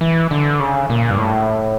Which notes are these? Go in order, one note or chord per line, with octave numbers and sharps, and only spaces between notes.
E3
D3
C#3
A#2
G2
A2